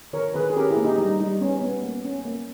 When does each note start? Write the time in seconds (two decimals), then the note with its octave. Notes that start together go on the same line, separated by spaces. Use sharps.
0.13 D#3 A#4 C#5
0.34 D#3 G#4 B4
0.50 G#4
0.56 C#4 G4 A#4
0.71 E4 G#4
0.77 A#3
0.84 D#4 G4
0.98 G3 D#4
1.20 G3 D#4
1.41 B3 C#4
1.62 B3
1.83 A#3
2.05 C#4
2.25 A#3